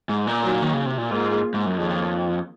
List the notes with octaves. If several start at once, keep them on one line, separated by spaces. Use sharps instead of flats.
G#2
A#2
F#3 A#3 D#4
D#3
C#3
C3
A#2
G#2 A#3 F4 G#4
G#2
F#2
F2 D#3 A#3 F4 G#4 C#5